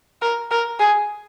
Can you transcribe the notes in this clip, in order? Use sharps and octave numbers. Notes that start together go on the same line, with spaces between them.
A#4
A#4
G#4